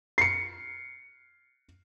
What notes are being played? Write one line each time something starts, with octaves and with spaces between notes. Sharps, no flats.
C7 C#7